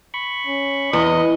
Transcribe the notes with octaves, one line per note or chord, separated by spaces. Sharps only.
B5 C#6
C#4
E2 B4 D#5